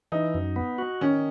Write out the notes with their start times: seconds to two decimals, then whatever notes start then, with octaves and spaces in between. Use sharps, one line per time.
0.12 E3 D#4
0.34 F#2
0.56 B3
0.78 F#4
1.01 D#3 C#4